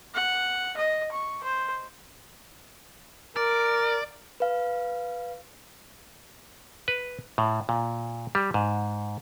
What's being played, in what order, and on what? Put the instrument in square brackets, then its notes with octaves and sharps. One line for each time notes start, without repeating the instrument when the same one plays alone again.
[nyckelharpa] F#5
D#5
C#6
C5
[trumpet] A#4 [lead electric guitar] D5
[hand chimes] B4 F5
[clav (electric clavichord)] B4
A2
A#2
G3
G#2